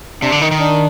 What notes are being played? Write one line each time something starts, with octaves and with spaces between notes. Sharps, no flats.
C3 D4
D3
D#3 D#4
D#3
D4